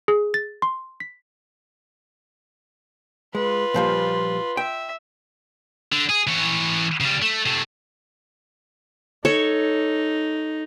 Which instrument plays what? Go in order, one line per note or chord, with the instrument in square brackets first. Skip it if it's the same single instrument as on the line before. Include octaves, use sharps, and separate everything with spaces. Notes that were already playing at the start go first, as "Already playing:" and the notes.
[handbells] G#4
A6
C6
B6
[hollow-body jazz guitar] G#3 [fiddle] F4 B4
[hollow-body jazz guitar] A#2 F3 G3
[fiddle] E5 [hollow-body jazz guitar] G5
[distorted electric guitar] D3
G#4
E3 C#5
C#3 G3
A3
C3 A3
[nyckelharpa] D#4 [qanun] A4 C#5